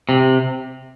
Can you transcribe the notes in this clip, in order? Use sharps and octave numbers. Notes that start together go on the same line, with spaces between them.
C3